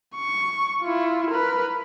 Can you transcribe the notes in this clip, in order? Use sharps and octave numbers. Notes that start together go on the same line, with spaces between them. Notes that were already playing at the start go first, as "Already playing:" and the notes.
C#6
E4 F4
A#4 B4